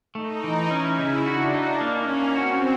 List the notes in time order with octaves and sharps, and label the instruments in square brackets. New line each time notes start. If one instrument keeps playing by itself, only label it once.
[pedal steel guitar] A3 [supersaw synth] D#4
[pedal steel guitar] E3
[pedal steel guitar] C#4 [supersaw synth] E4
[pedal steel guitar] C#3
[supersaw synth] D4 [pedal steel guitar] F#4
[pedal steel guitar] D#4
[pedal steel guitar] A#3 [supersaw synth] C#4
[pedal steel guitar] A#3
[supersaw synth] C4 [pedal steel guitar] F#4